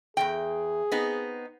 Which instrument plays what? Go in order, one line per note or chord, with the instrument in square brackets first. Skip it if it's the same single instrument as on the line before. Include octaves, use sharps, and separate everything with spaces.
[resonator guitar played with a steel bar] E2 F3 G5 [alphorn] G#4
[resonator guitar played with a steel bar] B3 C4 D#4